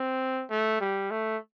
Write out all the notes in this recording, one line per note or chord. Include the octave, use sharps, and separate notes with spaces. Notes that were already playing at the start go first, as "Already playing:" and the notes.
Already playing: C4
A3
G3
A3